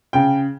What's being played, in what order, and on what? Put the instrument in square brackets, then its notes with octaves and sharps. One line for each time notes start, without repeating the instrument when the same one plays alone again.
[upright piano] C#3 G5